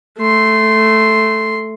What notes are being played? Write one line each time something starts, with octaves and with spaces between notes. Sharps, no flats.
A3 C6